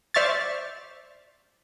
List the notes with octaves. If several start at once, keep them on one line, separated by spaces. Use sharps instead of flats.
C5 D5 E5 C#6 F6 A6